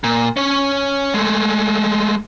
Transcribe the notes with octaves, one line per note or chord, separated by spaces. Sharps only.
A#2
C#4 C#5
G#3 A3